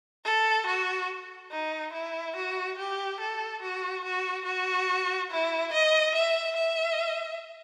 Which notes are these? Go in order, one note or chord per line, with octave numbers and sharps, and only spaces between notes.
A4
F#4
D#4
E4
F#4
G4
A4
F#4
F#4
F#4
E4
D#5
E5
E5